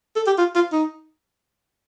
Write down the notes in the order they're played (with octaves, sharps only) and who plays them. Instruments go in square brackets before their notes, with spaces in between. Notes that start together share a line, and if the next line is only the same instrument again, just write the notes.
[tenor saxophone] A4
G4
F4
F4
D#4